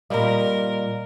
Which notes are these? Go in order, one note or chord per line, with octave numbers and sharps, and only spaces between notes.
A#2 G3 A#4 D5 D#5 F5